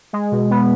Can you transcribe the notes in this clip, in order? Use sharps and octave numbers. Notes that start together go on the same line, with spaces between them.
G#3
B2
B3